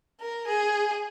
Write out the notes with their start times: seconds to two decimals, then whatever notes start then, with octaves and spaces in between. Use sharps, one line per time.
0.20 A#4
0.47 G#4